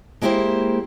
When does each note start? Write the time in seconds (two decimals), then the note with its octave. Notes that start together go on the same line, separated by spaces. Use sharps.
0.22 G#3 A#3 E4 G4 C5